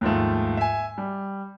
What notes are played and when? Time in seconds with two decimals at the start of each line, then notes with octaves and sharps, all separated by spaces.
0.01 D#2 G#2 F3 A3
0.57 E5 G#5
0.98 G3